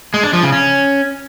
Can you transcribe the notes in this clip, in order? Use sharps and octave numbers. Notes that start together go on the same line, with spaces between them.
G#3
D4
F3
C#3
C#4